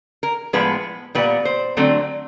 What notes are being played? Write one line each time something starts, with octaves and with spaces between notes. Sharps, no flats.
A#4
A2 F3 G#3 B3 B4
A#2 G3 B3 B4
C5
D3 F#3 A3 C4